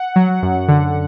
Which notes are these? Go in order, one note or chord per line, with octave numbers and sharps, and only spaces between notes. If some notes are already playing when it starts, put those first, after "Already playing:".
Already playing: F#5
F#3
F#2
D3